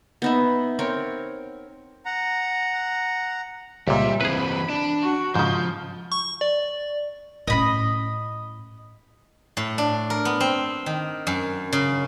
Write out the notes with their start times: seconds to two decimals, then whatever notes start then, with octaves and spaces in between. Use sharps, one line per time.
0.22 B3 D#4 E5
0.79 C4 A#4 C#5
2.05 F#5 A#5
3.88 C#2 A#2 G3 E5
4.21 E3 C4 G#4 B4 B5
4.69 D4
5.03 F#4
5.36 G#2 C#3 F3 G6
6.12 C#6
6.41 D5
7.47 A2 C#4 D#5 B5
9.57 A2
9.78 D4
10.10 A#4
10.25 B3
10.40 C4
10.86 D#3
11.27 F#2
11.73 C#3